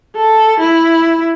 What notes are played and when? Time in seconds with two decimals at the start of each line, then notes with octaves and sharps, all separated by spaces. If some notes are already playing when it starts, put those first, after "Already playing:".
0.16 A4
0.60 E4